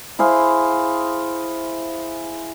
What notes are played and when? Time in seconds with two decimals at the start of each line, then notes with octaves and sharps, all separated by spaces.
0.19 E4 G#4 C5 F5